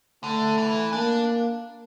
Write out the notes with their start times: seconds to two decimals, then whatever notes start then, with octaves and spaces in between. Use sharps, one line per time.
0.24 D3 A3
0.58 E3
0.93 A#3 D4